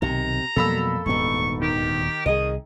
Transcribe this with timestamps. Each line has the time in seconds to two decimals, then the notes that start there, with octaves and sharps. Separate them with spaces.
0.02 B1 C3 D#3 A#5
0.56 F2 B2 F#3 G3 A#3 A4 B5 E6
1.06 D#1 D2 G#2 B3 D#4 C#6
1.62 D#3 G4
2.26 C2 G#4 D#5 D#6